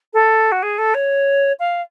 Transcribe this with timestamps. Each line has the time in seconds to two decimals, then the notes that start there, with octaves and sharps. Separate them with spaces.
0.13 A4
0.52 F#4
0.63 G#4
0.78 A4
0.94 C#5
1.59 F5